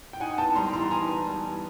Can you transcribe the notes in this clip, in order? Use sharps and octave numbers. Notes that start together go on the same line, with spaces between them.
G5
D#4 F#5 G#5
B3 G5 A5
G3 A#5 C6
E3 A#5 C6
D#4 G#5 A#5
B3
G3
E3